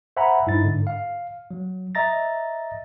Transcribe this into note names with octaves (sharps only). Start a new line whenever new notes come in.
C5 E5 F#5 G#5 A#5 B5
G2 D#4 E4 A6
G#2 D3
F5
F#3
D#5 E5 A#5 A6 A#6